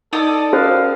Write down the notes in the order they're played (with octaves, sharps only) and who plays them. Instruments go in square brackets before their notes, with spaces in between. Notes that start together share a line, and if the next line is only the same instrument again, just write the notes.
[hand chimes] D#4 [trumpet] A4 [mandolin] D5 D#5
[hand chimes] C#4 A#4 [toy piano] F#4 C5 [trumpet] F5